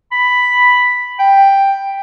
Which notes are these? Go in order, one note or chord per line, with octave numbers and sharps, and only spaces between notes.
B5
G5